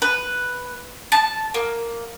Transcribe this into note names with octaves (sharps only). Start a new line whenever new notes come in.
B4
A5
A#3